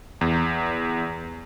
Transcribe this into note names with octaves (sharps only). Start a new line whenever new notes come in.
E2